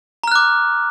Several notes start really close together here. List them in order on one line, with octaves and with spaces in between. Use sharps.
A#5 F6 F#6 D6